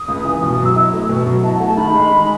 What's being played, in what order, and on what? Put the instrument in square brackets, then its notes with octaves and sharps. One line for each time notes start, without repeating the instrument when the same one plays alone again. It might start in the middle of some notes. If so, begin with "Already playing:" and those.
Already playing: [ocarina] D#6
[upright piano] C#2
E3
[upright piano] B2 [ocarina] D#6
[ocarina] D#6
[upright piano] F#3
[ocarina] E6
[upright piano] E4
A3
B2
F#3
[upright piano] E4 [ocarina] A5
[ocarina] F#5
[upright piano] A3
[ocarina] A5
[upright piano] D#3 [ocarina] B5
[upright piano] G#3
D#3